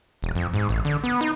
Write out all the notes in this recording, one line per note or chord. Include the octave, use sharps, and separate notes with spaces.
E1
F2
G#2
A1
D3
B3
D#4